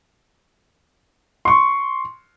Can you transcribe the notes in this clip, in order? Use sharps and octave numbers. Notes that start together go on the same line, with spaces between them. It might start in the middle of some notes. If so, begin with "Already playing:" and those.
C6 C#6